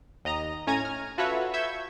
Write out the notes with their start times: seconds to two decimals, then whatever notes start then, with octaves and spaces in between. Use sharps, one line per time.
0.25 D#2 D#5 A#5 A#6
0.67 A2 C#4 G#5 A#5 G#6 D#7
0.85 F6
1.18 F4 F#4 A4 B4 C#5 E5
1.54 E5 C#6 E6 G6 G#6